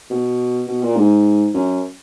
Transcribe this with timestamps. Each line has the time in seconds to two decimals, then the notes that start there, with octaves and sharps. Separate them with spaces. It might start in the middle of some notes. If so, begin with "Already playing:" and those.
0.10 B2
0.67 B2
0.82 A#2
0.96 G#2
1.54 F#2